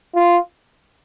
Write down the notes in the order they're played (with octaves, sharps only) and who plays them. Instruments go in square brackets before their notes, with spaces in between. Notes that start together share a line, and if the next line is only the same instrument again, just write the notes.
[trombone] F4